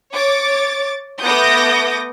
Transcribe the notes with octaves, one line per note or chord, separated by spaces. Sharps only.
C#5 D6 A6
A3 B3 D6 D#6 G6 A#6